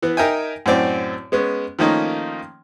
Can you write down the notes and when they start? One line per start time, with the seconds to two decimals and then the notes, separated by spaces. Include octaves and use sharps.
0.02 E3 B3
0.17 D#4 A#4 E5 G5 G#5
0.66 F#2 A2 C4 D5
1.32 G#3 B3 C#4
1.79 D#3 F3 A3 A#3 C#4 D#4